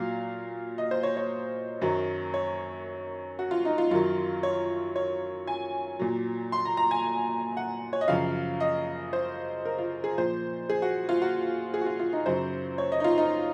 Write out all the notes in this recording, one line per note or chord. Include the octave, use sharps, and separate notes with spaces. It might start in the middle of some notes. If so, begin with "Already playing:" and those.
Already playing: A#2 F#3 F5
D#5
C5
C#5
C#5
F#2 D#3 F#3
C#5
F#4
F4
D#4
F4
F#2 D#3 F#3 F4
C#5
C#5
G#5
A#2 F#3
C6
A#5
A#5
G#5
F#5
C#5
D#5
F#2 C#3 F3 F5
D#5
C5
A#4
F4
G#4
A#2 F3 C5
G#4
F#4
F4
F#4
G#4
F#4
F4
F4
D#4
F#2 C#3 F#3 C5
C#5
D#5
D#4
F4
D#4